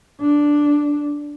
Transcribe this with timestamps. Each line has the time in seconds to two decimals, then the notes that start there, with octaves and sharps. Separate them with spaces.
0.21 D4